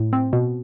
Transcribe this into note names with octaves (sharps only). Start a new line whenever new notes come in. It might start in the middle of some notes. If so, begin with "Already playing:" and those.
Already playing: A2
C4
B2